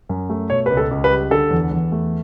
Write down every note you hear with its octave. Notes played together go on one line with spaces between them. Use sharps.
F#2
A3
B2 C#5
C#2 B4
A4
C#2
B4
G3
D3 A4
E2
E2
A3